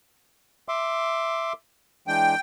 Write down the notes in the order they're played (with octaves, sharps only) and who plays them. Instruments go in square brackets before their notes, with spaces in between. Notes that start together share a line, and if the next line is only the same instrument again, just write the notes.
[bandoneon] E5 C6 D6
[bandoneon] E3 G#3 D4 [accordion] G5